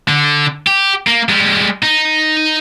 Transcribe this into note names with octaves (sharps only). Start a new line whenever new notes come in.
D3
G4
A#3
G3 G#3
D#4